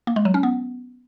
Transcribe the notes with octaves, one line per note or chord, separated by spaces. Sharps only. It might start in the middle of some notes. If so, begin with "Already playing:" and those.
A#3
G#3
F#3
C#4
B3